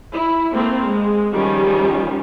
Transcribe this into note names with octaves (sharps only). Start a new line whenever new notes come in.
E4
A3 A#3 C4
G#3
D#3 F3 G3 C#4